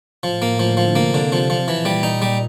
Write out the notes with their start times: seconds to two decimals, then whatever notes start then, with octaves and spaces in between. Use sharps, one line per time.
0.23 A2 F3
0.42 A#3
0.59 D3 F3
0.77 F3
0.96 C3 A#3
1.14 D3
1.32 F3
1.50 F3
1.67 A#2 E3
1.85 G3
2.03 A#2 D#4
2.22 G3